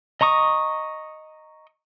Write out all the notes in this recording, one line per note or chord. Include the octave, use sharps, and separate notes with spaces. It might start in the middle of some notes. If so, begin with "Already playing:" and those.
D#5 A#5 C#6 D#6